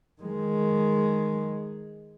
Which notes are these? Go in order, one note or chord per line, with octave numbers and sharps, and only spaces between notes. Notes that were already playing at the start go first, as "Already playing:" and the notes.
D#3 G#3